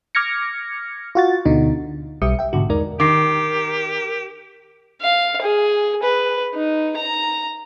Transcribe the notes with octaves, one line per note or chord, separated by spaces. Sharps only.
D6 F6 G#6 A#6 C#7
F4 F#4 A6
D2 B2 D3 D#4
B1 G3 G4 E5 D#6 C#7
E5 G5
G#2 B2 D3 F#4
E2 G#3 D#4 A#4 D5
D#3 G4 A#4 D6 C7
F5
G#4
B4
D#4
A#5